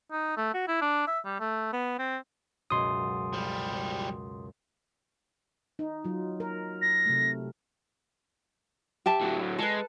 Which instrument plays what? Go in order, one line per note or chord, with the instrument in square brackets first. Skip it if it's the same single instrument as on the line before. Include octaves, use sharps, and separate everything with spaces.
[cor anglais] D#4
A3
F#4
E4
D4
E5
G3
A3
B3
C4
[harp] C#2 F#2 B2 [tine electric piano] C6 D#6
[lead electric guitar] F3 G3
[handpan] D#4
F#3 F4
A#4
[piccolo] A#6
[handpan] C3 A3
[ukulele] G4 E5 A5
[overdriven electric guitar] A2 F#3
[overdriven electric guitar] G#3 [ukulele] A4 B4